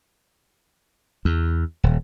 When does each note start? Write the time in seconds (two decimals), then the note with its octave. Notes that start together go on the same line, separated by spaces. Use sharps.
1.25 E2
1.84 D#1